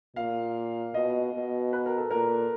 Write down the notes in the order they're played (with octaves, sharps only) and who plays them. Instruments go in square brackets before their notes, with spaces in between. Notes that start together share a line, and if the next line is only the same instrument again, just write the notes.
[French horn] A#2 [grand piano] F5
[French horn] B2 [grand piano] D#5
[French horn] B2
[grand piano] B4
A#4
A4
[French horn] A#2 [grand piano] A#4